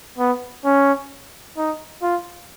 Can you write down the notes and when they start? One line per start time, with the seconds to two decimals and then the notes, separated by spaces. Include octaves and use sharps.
0.18 B3
0.65 C#4
1.57 D#4
2.02 F4